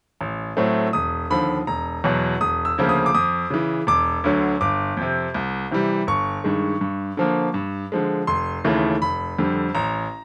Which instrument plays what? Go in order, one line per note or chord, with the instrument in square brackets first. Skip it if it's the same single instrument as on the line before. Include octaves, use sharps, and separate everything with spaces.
[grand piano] A1
A2 F#3 A3 C4
E1 D#6
D#2 D3 F3 B5
E1 A#5
E2 B2 F#3
E1 D#6
E6
D2 C#3 F3 A#3
D#6
D6
F2 D#6
C#3 E3
E1 D6
D2 D3 F#3
G1 D6
F2 C3
C2
C3 E3 G3
G1 C#6
G2 D#3 G#3
G2
D3 F3 A#3
G2
D3 F3 G#3
F1 C6
D#2 C#3 E3 A3
F1 B5
F2 D3 G3
A1 A#5